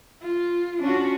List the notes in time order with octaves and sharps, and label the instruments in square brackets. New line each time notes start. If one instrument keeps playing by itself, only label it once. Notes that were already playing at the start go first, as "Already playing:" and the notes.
[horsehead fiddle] F4
[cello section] C#4 F#4 [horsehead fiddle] D4 F4